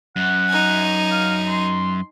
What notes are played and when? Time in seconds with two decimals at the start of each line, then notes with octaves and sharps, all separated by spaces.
0.16 F#2 F#5
0.49 D#4 G#5
1.11 F5
1.48 C6